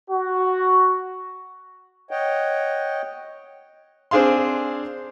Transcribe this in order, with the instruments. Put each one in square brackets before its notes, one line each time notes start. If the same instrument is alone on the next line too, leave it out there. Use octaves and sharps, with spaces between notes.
[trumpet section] F#4
[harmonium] C#5 D#5 F#5 G5
[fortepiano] C4 D4 G#4 F5 C6